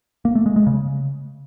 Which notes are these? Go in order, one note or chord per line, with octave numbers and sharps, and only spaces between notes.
A#3
A3
G#3
G#3
C#3